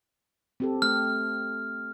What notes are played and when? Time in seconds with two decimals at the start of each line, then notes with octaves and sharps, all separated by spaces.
0.60 C4 G4 A4
0.82 A3 A4 F6